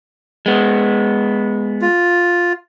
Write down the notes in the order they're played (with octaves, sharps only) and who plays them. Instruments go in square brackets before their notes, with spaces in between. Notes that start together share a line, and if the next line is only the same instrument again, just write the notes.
[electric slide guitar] G#3 B3
[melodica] F4